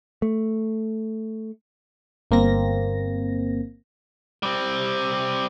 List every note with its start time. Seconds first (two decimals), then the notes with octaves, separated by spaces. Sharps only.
0.22 A3
2.31 G1 A#3 C4 A#6
4.43 G3 C4